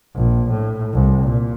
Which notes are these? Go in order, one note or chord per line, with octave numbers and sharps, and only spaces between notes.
A#1
A2
C2
A#2